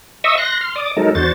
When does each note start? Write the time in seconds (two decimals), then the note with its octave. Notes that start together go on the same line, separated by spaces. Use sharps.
0.24 D#5 E5 C#6 D#6 E6
0.38 C6 F#6 A#6
0.61 C6 F6
0.76 D5 D6 D#6
0.97 F#3 G#3 D#4 A4 A#4
1.15 E2 D4 F#4 C5 A6